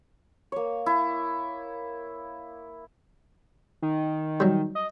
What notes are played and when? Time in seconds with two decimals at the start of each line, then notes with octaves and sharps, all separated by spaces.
0.52 A#3 C#5
0.86 E4
3.82 D#3
4.40 F#3 G3
4.75 D#5